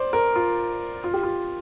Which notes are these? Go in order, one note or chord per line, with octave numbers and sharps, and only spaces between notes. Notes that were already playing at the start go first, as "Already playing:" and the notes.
Already playing: C5 D5
A#4
F4
F4
G4
F4